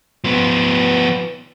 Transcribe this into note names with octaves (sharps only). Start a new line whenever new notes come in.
F3 B3